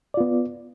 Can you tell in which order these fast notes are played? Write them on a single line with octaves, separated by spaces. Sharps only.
D5 F4 B3